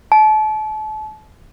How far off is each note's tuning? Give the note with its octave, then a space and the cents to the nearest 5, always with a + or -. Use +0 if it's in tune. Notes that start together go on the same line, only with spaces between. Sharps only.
A5 -35